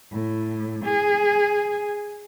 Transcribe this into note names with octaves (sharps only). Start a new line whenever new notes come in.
A2
G#4